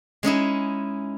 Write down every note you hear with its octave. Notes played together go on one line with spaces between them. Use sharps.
G#3 C#4 D#4 E4